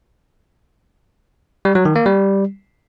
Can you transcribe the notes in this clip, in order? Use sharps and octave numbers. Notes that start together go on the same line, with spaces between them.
G3
F#3
D#3
A#3
G3